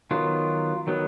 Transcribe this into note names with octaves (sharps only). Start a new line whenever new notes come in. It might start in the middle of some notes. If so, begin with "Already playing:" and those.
D#3 F#3 B3 F4
D#3 F#3 B3